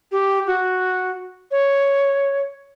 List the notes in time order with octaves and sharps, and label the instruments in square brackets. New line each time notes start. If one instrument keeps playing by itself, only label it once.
[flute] G4
F#4
C#5